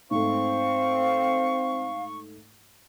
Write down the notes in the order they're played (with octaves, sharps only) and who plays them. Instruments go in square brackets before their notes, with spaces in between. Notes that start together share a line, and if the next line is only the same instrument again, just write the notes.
[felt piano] G#2 A3 [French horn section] C4 [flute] F5 [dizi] C#6